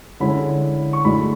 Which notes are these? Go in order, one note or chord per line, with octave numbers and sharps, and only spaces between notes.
D3 G#3 C#4 E4 B5
C#6
A2 G#3 D4 B5